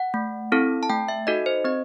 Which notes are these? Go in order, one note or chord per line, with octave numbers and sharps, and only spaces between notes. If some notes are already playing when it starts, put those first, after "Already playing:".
Already playing: F#5
A3
C4 E4 A4
A5
A3 G5
E5
D#4 F#4 A4 D#5
C5
C4 D#5